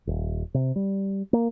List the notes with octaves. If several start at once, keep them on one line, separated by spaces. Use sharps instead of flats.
D#1
C3
G3
A#3